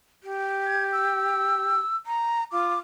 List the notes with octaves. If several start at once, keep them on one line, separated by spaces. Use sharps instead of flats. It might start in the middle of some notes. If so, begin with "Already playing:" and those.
G4
G#6
E6
A#5
F4 D6